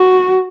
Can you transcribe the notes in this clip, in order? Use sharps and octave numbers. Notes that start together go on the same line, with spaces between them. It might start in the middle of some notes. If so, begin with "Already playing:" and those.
Already playing: F#4